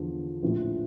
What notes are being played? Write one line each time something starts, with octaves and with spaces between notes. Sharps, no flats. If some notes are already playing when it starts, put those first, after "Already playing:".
Already playing: E2 D3 F3
A#1 A2 F3